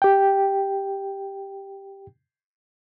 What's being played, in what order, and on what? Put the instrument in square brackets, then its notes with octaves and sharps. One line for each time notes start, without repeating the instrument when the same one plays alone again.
[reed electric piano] G4 G5